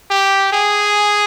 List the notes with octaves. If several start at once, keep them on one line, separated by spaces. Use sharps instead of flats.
G4
G#4